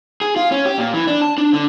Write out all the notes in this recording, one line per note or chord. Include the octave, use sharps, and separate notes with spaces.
G#4
F4
C#4
G4
A#2
E3
D4
A5
D4
D3